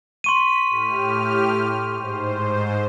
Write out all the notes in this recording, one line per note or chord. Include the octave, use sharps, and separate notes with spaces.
C6 C#6 B6 D#7
A2 G4 F6
G#2 C5